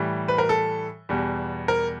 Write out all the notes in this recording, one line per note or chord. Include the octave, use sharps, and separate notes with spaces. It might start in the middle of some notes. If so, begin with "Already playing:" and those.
Already playing: A2 E3 G3
B4
A#4
A4
E2 B2 G3
A#4